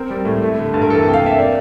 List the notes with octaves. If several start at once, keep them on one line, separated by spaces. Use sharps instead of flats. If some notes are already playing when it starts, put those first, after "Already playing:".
Already playing: C4 A#4
G3
A2
A3
D3
G2
A#4
E3 A4
C3 G5
F5
A#3 E5
A#3 D5